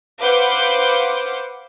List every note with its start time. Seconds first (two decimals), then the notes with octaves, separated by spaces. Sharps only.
0.20 B4 C5 F5 F#5 D6 G6